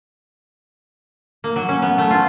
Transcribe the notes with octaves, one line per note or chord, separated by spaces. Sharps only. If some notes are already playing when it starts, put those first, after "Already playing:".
A#3
F#3
C#4
B3
A3
F4